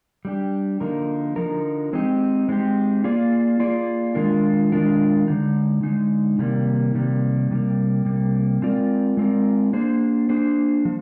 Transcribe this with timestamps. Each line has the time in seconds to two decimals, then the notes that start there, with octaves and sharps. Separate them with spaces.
0.25 G3 D4 G4
0.80 D3 F3 A#3 D#4 A#4
1.36 D3 F3 A#3 D#4 A#4
1.93 G#3 C4 D#4 G4
2.49 G#3 C4 D#4 G4
3.04 A#3 F4 G#4 D5
3.60 A#3 F4 G#4 D5
4.15 D#3 G#3 D4 F4 A#4
4.72 D#3 G#3 D4 F4 A#4
5.28 D3 G#3 D#4
5.83 D3 G#3 D#4
6.39 C3 D#3 G3 A#3
6.95 C3 D#3 G3 A#3
7.51 C3 G3 A#3
8.05 C3 G3 A#3
8.62 G#3 C4 F4 A#4 D5
9.17 G#3 C4 F4 A#4 D5
9.73 A#3 D4 G#4 C5
10.29 A#3 D4 G#4 C5
10.85 F3